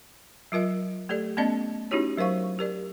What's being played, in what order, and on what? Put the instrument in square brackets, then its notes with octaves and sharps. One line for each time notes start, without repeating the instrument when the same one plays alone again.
[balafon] F#3 F4 A#4 D#5 E5
A3 G4 A4 D5
A3 B3 C#4 D5 D#5 A5
C#4 D#4 E4 F#4 G4 C#5
F#3 A#4 C5 F5 C#6
G4 A#4 D5